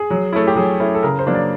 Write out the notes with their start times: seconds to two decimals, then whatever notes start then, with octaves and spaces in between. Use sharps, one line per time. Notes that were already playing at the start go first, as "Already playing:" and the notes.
Already playing: G#4
0.10 F#3
0.33 A3 C#4 E4
0.47 G4
0.56 F#3 G#4
0.80 A3 C#4 E4
0.95 A4
1.03 C#3 A#4
1.19 C5
1.27 F#3 A#3 D4
1.34 D5